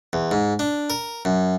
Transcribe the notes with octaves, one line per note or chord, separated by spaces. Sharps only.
E2
G#2
D4
A#4
F#2